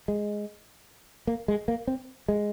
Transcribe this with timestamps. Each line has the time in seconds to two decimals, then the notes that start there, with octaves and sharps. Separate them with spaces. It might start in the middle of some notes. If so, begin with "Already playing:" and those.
0.08 G#3
1.27 A#3
1.48 G#3
1.68 A#3
1.87 C4
2.28 G#3